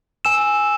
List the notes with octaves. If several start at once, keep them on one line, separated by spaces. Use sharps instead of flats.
G#5 E6 E7